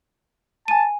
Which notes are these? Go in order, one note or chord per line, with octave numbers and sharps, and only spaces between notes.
G#5 A5 D#7